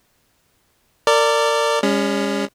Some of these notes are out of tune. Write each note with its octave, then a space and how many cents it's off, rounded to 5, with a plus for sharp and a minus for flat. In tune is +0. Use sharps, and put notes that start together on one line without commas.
A#4 -30 D5 +0
G#3 -45 C#4 +10